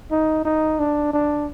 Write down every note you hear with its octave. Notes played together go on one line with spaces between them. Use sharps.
D#4
D#4
D4
D4